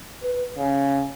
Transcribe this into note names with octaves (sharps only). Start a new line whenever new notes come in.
B4
C#3